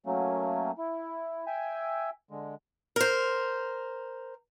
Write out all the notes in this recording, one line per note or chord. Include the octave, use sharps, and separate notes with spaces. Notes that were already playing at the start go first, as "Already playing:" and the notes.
F#3 A3 A#3 C#4
E4
E5 G5 G#5
D3 G#3
A#4 C5